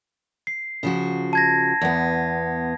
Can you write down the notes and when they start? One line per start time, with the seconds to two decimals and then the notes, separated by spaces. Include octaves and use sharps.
0.47 C7
0.83 C#3 F3 F#4
1.33 A5 G#6 A#6
1.81 E2 B3